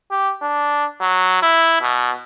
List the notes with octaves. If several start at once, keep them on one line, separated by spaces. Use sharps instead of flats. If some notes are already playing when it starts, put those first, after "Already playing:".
G4
D4
F#3
E4
B2